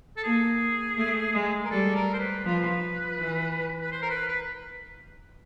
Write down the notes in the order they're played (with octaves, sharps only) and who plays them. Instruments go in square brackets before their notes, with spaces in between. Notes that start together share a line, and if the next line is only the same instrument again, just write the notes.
[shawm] A4
[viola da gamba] A#3 [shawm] G#4
[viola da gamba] A3
G#3
[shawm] A#4
[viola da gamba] G3 [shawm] A4
[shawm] A#4
C5
B4
[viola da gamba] F3 [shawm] B4
[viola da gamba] E3
[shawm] B4
C5
A#4
B4
B4